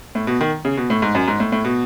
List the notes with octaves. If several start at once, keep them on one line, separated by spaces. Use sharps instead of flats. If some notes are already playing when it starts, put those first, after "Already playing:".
A2
B2
D#3
C#3
B2
A2
G#2
F#2
G#2
A2
A2
B2